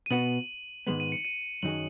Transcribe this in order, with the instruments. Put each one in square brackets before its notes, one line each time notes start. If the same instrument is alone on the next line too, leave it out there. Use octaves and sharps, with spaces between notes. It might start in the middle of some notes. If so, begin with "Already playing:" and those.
[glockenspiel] D#7
[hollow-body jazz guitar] B2 B3 F#4 [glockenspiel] F#7
[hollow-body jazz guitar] G#2 D#3 G#3 B3 [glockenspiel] F#7
[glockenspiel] D#7
C#7
D#7
[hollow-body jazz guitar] F#2 D#3 F#3 D#4 G#4 [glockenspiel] F#7